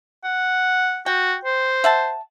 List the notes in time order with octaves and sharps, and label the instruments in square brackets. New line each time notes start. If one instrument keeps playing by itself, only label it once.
[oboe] F#5
[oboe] F#4 [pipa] G5
[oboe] C5
[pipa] E5 F#5 A5